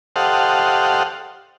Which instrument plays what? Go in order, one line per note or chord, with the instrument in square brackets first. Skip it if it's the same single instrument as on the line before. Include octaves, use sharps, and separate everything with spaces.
[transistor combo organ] G4 A4 C5 D#5 F5 F#5